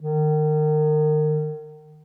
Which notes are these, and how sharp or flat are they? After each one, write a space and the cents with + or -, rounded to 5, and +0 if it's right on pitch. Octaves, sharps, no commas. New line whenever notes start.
D#3 -30